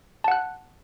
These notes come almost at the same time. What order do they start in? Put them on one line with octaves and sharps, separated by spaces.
A5 F#5 F#6